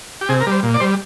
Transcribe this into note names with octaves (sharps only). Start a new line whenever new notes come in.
G4
C3 G#4
A#4
G3
C5
A#2
D5
G3 C5